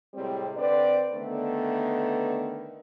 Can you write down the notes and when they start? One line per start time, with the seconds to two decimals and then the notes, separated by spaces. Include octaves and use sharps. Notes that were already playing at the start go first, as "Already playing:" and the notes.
0.14 A2 C3 G3 G#3 C4
0.56 D3 C4 B4 D5
1.14 D3 D#3 A3 B3